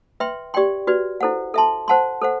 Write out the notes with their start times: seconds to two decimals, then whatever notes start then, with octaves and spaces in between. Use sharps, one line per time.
0.20 B4 E5 G5 C6
0.54 G4 D5 G5 C6
0.87 F#4 B4 D5
1.21 E4 A4 C5 F#5
1.54 A4 E5 A5 C6
1.88 C5 F#5 A5 C6
2.22 A4 C5 F#5